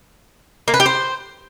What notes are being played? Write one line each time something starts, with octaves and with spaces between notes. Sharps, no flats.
A#3
B4
G4
C5